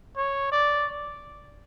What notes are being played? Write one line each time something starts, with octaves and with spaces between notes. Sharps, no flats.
C#5
D5